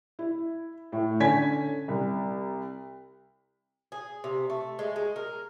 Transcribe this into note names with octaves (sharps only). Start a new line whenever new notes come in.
E4
A2
D3 C#4 G#5 G#6 B6
C2
G#4
C3
A3
G#3
G#3
A#4